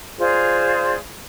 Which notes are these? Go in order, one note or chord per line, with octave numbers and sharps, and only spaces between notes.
F4 G#4 C5 D5